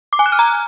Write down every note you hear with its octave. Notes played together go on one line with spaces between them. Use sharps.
D6
G#5
F#6
F6
A#5